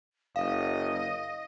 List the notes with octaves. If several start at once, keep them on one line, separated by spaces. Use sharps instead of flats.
F#1 D#5 F5